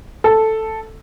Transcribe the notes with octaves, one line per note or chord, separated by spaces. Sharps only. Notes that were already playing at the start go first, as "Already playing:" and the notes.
A4